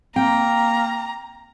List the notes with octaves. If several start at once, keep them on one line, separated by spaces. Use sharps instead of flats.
A#3 C4 G5 A#5